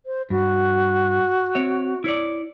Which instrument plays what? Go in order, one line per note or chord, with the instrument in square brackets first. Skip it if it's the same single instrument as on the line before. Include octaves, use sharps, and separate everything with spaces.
[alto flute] C5
[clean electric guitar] G2 [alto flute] F#4
[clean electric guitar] C4 C#5 E5
E4 C#5 D5